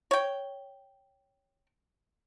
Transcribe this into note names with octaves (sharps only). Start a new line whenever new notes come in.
C#5 G5